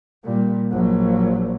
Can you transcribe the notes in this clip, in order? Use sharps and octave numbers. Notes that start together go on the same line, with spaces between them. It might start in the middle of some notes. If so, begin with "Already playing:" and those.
A#2 G3
A#1 F#3